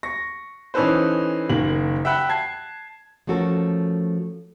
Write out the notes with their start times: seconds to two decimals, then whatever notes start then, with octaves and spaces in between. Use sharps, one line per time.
0.03 C#6 A#6
0.74 E3 C#4 D#4 A4 B4 C5
1.50 F#1 D#3 A#3 F#7
2.05 E5 F#5 G5 B5 F#6
2.29 A5 G#6 C7
3.27 F3 A3 C#4 F#4 A4 A#4